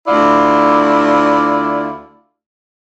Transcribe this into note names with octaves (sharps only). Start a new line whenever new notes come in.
D2 E4 F4 D5